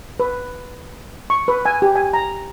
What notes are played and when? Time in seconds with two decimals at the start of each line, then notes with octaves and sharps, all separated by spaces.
0.20 B4
1.30 C#6
1.48 B4
1.65 G#5
1.82 G4
1.96 G#5
2.13 A#5